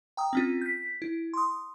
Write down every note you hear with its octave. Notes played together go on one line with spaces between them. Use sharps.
G5 A#5 D#6
C4 C#4 F4
G6 B6
E4
C6 D#6